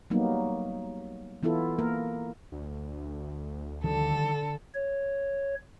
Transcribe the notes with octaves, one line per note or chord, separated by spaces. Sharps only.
F#3 G3 A#3 B3 D#4
E3 B3 E4 F4 A4
A#3 A#4
D2
D3 D#3 F3 G3 A4
C#5